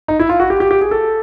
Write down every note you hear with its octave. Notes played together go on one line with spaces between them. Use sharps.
D#4
E4
F4
F#4
G4
G4
G4
G#4
A4